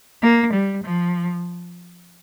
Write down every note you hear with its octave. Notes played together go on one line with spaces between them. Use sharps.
A#3
G3
F3